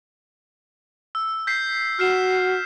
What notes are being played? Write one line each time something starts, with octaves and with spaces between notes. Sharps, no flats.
E6
G6 B6 C7
F#4 F6 C7 E7